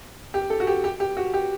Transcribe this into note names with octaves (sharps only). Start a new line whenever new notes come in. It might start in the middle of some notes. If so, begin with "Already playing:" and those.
G4
A4
F#4
G4
G4
G4
F#4
G4